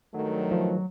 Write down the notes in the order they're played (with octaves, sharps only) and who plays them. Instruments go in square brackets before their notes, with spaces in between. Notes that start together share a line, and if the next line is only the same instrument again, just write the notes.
[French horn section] G2 D#3 A3 [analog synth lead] F#3
[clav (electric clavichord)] F3